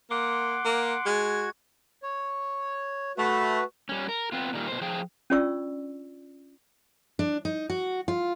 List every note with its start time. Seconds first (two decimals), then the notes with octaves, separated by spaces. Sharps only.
0.11 A#3 F#5 C6 D6
0.65 A#3
1.06 G#3 F#4 G#6
2.03 C#5
3.18 A3 F#4 B4
3.89 G3 C#4
4.09 A#4
4.32 B3 C4 F4
4.53 A#2 D#3 G3
4.68 B2 C5
4.81 F3 G#4 F5 G5
5.30 C#4 D4 F4 D5 C#6 E6
7.19 D4
7.45 D#4
7.70 F#4
8.08 F4